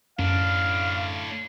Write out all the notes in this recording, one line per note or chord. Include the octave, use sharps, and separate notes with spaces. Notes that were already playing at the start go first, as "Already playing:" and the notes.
F#2 A2 D4 F5